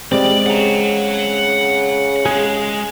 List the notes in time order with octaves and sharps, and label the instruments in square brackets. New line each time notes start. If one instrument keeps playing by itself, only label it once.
[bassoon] G3 [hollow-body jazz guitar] G#3 C4 [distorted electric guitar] D5
[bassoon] C#3 [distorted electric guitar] F#5 A#5
[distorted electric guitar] G#3 [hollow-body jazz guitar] G#4